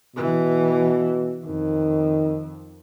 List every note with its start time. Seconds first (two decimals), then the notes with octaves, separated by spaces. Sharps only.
0.16 B2 E3
1.45 F2 D#3